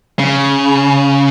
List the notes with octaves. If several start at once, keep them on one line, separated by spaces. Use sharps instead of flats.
C#3